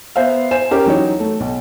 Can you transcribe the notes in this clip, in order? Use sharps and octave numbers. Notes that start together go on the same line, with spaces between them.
B3 C5 E5 F5
C5 G#5 E7
C#4 G4 A#4
E3 F#3 D#4 C#5
A3
B1